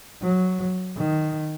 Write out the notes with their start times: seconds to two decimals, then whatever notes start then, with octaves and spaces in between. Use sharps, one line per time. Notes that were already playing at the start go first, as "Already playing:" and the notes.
0.22 F#3
0.97 D#3